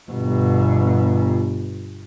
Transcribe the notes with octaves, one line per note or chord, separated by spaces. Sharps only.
G1 B2